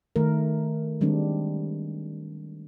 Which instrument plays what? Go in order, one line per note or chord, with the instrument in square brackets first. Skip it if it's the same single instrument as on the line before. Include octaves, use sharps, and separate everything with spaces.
[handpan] D#3 A3 A#4
D#3 G3 G#3 C4 D4